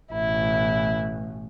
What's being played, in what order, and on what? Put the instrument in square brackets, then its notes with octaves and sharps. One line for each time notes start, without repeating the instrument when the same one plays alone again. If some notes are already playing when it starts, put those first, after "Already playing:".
[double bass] A1 B2 [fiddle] E4